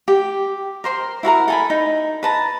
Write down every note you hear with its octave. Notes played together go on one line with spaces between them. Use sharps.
G4
A#4 C5 C6
E4 F#4 A#4 A#5
A4 G#5 B5
D#4
B4 A5 A#5